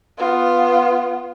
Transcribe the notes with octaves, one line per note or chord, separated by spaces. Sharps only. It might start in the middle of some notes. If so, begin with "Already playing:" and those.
B3 F4